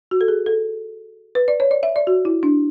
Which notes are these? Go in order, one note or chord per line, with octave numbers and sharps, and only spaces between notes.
F#4
A4
G#4
A4
B4
D5
C#5
D5
E5
D5
F#4
E4
D4